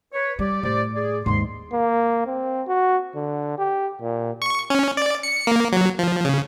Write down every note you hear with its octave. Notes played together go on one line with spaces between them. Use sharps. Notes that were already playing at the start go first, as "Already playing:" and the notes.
B4 C#5
G3 G4 D5
A2 G4 C5 D5
G#4 D5
D#2 G#2 C6
A#3
C4
F#4
D3
G4
A#2
C#6
C#4
D5
C#7
A#3
F#3
F3
C#3